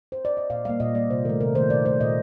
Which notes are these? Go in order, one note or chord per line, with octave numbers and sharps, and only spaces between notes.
C5
D5
D#5
A#2 F5
G3 A#3 F5
A#2 D#5
G3 A#3 D5
C3 C5
D#3 A3 A#4
C3 A#4
D#3 A3 C5
A#2 D5
A3 C5
A#2 D#5